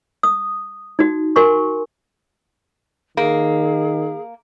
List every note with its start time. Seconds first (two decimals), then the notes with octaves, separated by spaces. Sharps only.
0.23 D#6
0.99 D#4 F#4
1.36 F#4 A#4 G#5 C6 C#6
3.17 D#3 A#3 G#4